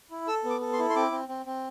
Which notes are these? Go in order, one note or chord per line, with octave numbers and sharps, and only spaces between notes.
E4
A4 E6
B3
D6
A4
C6
E4
C6
C4 D6
C4
C4
C4